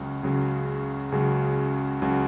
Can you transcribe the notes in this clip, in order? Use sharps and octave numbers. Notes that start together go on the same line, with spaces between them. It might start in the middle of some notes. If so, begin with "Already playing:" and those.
Already playing: C#2 C#3 F#3
C#2 C#3 F#3
C#2 C#3 F#3
C#2 C#3 F#3